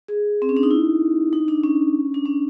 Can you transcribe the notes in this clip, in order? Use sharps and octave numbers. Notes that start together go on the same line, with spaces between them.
G#4
C4
C#4
D4
D#4
E4
D#4
D4
C#4
D4
C#4